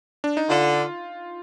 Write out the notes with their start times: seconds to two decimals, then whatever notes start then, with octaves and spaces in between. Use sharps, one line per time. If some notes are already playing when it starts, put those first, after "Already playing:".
0.24 D4
0.37 D#4
0.49 D3 F4